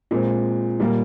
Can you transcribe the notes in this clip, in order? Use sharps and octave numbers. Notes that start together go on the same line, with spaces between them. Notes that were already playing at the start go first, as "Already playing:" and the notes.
A#2 G#3 C4
A#2 G3 A#3